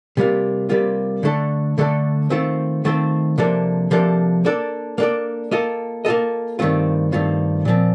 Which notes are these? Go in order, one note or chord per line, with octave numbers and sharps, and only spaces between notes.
C3 G3 A#3 F4
C3 G3 A#3 F4
D3 A3 D4 A4
D3 A3 D4 A4
D#3 A3 C4 F4 C5
D#3 A3 C4 F4 C5
C3 F3 A#3 D4 A4
C3 F3 A#3 D4 A4
A#3 D4 A4 D5
A#3 D4 A4 D5
A#3 F4 A4 D#5
A#3 F4 A4 D#5
G2 D#3 A3 C4 F4
G2 D#3 A3 C4 F4
A#2 F3 C4